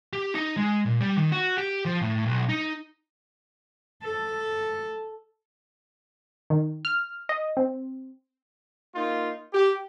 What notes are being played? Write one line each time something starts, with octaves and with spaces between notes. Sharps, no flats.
G4
D#4
G#3
A#2
G3
D#3
F#4
G4
F3
A2
B1
D#4
A4
D#3
F6
D#5
C4
A#3 D#4 F4
G4